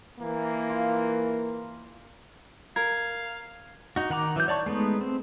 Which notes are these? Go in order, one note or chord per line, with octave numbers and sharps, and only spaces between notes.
E3 A#3
F4
A#4 F5 G#6
D#4 F#4
D#3 F#5 A#5 D6
E3 F#3 G6
C#5 D5 A5 C#6
G#3 A3 B3 D#4
C4